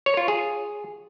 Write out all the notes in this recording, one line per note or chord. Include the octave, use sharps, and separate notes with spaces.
C#5
F4
G#4